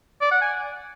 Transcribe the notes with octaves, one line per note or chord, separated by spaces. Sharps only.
D5
F#5
G#5